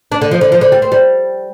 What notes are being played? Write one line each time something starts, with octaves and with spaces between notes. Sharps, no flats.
D4
D3
F3
D3
F3
D3
G3
C4
G3